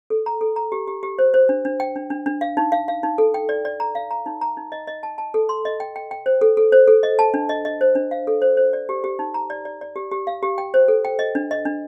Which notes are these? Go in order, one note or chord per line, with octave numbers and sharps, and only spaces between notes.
A4
A#5
A4
A#5
G4
G4
G4
C5
C5
D4
D4
G5
D4
D4
D4
F5
D#4
F5
F5
D#4
A4
G5
D5
D5
A#5
F5
A#5
D#4
A#5
D#4
D#5
D#5
A5
A5
A4
C6
D#5
G5
G5
G5
C5
A4
A4
C5
A4
D#5
A5
D4
D#5
D#5
C5
D4
F5
A4
C5
C5
D5
G4
G4
D#4
A#5
D5
D5
D5
G4
G4
F5
G4
G5
C5
A4
G5
D#5
D4
D#5
D4